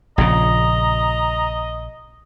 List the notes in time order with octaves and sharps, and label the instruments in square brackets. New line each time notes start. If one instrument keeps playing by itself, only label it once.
[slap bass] A#1 A#2 C#3 [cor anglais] D#5 [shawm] A#5